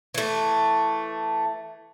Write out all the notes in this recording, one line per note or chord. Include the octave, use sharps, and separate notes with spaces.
E3 A3